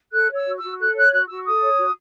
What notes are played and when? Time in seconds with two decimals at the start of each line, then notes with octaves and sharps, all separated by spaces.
0.12 A4 F#6
0.30 C#5
0.35 E6
0.45 F#4
0.57 E6
0.62 F#4
0.79 A4 F#6
0.95 C#5 F#6
1.11 F#4 F#6
1.28 F#4 E6
1.45 A4 D#6
1.62 C#5
1.77 F#4